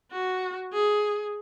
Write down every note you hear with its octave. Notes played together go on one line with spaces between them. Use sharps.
F#4
G#4